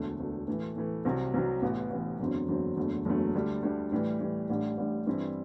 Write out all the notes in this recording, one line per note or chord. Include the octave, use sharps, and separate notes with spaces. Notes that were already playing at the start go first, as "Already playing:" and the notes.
Already playing: E1 D2 D3 A3
E1 D2 D3 A3
A2 E3 A3
A2 E3 A3
C2 C3 F#3
C2 C3 F#3
A1 A2 E3 B3
A1 A2 E3 B3
F#1 E2 D3 F#3 C4
F#1 E2 D3 F#3 C4
F#1 E2 D3 F#3 A3
F#1 E2 D3 F#3 A3
D2 D3 G3 D4
D2 D3 G3 D4
A2 E3 G3
A2 E3 G3
A1 A2 G3 D4
A1 A2 G3 D4
G2 E3 G3 C4 E4